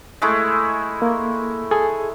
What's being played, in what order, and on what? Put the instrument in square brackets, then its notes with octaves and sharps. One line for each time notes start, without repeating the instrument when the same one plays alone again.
[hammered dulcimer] G#3 A3 E4
[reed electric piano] A#3
G#4 A4 G#5